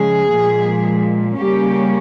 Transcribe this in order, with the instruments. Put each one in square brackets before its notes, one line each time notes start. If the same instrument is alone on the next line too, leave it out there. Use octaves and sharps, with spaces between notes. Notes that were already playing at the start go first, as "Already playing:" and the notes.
Already playing: [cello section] C#3 F3 G#3 G#4
A#2 F3 G#3
C#3 G3 A#3 C#4 G4